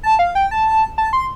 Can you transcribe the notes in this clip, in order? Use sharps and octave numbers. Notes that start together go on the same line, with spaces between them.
A5
F5
G5
A5
A5
C6